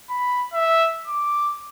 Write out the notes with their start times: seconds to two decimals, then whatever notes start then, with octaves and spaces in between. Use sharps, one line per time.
0.10 B5
0.53 E5
1.08 D6